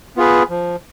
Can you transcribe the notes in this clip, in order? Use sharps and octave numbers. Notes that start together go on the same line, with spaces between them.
B3 F4 G#4 B4
F3